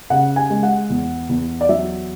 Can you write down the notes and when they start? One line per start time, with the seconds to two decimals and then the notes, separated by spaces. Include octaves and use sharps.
0.10 C#3 F#5
0.36 G#5
0.50 G#3
0.63 F#5
0.90 E2
1.29 E2
1.61 D5
1.69 F#3 E5